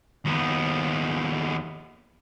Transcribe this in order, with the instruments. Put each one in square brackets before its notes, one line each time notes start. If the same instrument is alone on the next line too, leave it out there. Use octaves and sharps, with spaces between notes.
[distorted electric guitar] D#2 B3